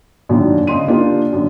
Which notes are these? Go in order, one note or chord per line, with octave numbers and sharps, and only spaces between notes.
F#2 A#2 D3 D#3 D4
C#3 D#5 C6 D#7
A#3 D4 F4 G4
F#2 D3